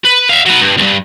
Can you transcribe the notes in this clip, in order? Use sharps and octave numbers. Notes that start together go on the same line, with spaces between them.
B4
E5 F5
F#3 B4
G2
C#2 G2